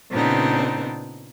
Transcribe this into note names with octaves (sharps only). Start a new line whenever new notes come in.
A#2 C#3 B3 C4 D4 D#4